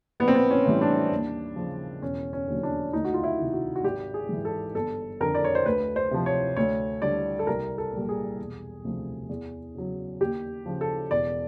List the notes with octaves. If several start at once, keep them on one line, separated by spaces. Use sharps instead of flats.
A#1 B3
C4
B3
C#4
A2 E3 G3
D4
D#2
C#3 F3
E1 C#4
C#4
D#2 D3 F#3
D4
D2 D#4
F#4
F4
E4
C3 D#3
F#4
F#4
G#1 G4
G#4
G#2 E3
A4
G1 A4
F2 D3 A#4
D5
C#5
C5
D2 B4
C5
C3 F3
C#5
D2 C#5
D3 G3 D5
A4
C2 A#4
A4
A#2 G3
G#4
E1
D2 C3 F3
E2
C#3 F#3
D#2 G4
C#3 F3
A4
E1 D5